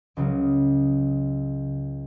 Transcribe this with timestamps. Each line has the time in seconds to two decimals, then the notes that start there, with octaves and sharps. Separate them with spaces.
0.17 C#2 C#3 F#3